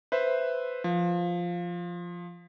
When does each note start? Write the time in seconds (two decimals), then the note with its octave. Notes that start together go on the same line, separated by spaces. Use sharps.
0.12 B4 C5 E5
0.84 F3